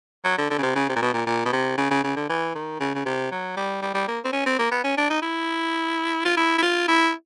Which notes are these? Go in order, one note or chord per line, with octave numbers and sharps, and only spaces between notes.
F#3
D3
D3
C#3
C3
C#3
C3
A#2
B2
A#2
A#2
B2
C3
C#3
C#3
C#3
D3
E3
D#3
C#3
C#3
C3
F#3
G3
G3
G3
A#3
C4
C#4
C4
A#3
B3
C#4
D4
D#4
E4
F4
E4
E4
F4
E4